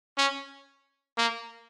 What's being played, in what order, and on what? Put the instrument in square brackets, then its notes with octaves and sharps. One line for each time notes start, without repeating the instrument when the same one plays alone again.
[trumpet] C#4
A#3